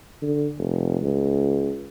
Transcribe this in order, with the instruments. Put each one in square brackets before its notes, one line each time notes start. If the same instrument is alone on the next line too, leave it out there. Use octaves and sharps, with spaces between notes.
[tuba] D3
F1
C#2